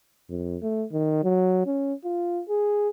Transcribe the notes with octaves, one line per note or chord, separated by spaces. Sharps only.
F2
A3
D#3
F#3
C#4
F4
G#4